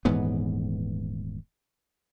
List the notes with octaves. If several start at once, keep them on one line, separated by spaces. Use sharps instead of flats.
D#1 G#2 E3 B3